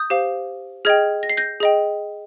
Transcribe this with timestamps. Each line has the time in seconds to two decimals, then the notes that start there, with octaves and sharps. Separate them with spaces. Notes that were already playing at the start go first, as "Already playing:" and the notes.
Already playing: D#6 G6
0.10 G4 C5 F5
0.85 G#4 D#5 G5 F6 G#6
1.23 A#6
1.29 C7
1.37 G6 A#6
1.60 G#4 D#5 G5